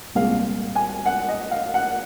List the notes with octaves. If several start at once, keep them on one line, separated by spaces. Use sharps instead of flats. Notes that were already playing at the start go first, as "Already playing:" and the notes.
C2 A#2 G#3 F5
G#5
F#5
D#5
F5
F#5